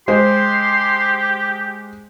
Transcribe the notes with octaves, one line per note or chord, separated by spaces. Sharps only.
G#3 G4 C5 C6